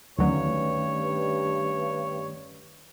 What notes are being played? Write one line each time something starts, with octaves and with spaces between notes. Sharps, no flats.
D2 G2 D#3 F#3 A3 C#4 C#5